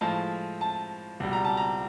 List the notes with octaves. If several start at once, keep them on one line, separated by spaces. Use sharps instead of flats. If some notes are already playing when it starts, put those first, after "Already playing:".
A2 F3 G#3 A5
A5
C#2 B2 G3
A#5
A5
A#5